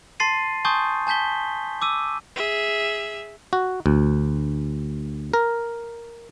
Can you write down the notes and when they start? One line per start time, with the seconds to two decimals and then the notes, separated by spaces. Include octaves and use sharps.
0.20 A5 C6 A6 C7 D#7
0.65 G#5 A5 C6 C#6 D#6 G6
1.07 G#5 A5 G6 B6 G7
1.82 D6 E6 D#7
2.36 G#4 E5
3.53 F#4
3.86 D2
5.34 A#4